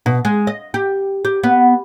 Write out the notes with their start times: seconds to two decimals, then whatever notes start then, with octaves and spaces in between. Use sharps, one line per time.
0.06 B2
0.25 G#3
0.47 D#5
0.74 G4
1.25 G4
1.43 B3